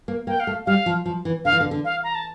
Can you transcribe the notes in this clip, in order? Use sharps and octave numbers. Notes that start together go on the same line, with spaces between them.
A#3
A#3 G5
F5
A3
G3 F5
F3
F3
E3
D3 F5
E3
D3
D3
F5
A#5
A5